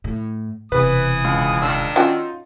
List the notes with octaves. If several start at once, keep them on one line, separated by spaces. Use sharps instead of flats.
A2
E1 C3 E3 B4 D#6
C#2
D#3 D4 E6
C#4 D#4 F4 F#4 G5